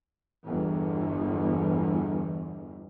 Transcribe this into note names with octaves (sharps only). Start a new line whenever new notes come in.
G1 E2